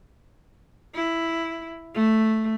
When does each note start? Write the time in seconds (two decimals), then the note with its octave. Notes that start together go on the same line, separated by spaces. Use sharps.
0.95 E4
1.95 A3